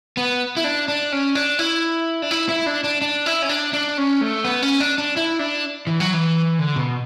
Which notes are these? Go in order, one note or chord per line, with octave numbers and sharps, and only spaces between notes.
B3
E4
D4
D4
C#4
D4
E4
D4
E4
E4
D4
D4
D4
E4
C#4
D4
D4
C#4
A3
B3
C#4
D4
D4
E4
D4
E3
F#3
E3
D3
B2